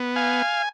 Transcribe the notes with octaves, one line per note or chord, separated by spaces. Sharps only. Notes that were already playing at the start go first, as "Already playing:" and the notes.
Already playing: B3
F5 G#5